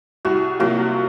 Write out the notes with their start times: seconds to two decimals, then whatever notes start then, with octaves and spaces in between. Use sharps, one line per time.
0.25 C2 F#4
0.60 C3 F#3 A#3 F4 F#4